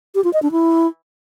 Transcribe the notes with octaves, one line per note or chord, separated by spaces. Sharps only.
G4
F4
D#5
D4
E4